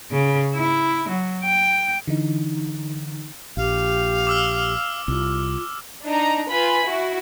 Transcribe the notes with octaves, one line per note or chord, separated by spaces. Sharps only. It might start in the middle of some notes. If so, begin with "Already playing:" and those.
C#3
E4
F#3
G5
D3 E3 D#4
A#1 G4 F5
D6 E6 F6
C2 F4
D4 D#4 A#5
F4 B4 G#5 B5
E4 F#4